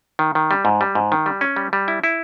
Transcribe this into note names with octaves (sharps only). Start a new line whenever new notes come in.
D#3
D#3
G3
G#2
G3
G#2
D#3
G3
C#4
G3
G3
E4
E4